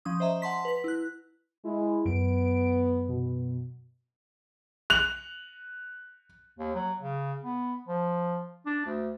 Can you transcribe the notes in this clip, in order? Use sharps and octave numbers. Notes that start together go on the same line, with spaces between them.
F3 C#4 D#6
C5 D#5 E5 A#5
F#5 A5 C6 B6
B4 B6
E4 F#6
G#3 E4
F#2 B3 D7
B2
F#6 F7
D#2
F#3
C#3
B3
F3
D4
D2